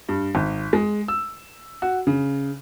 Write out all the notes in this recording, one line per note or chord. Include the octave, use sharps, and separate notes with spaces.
G2
G#1
G#3
E6
F#4
C#3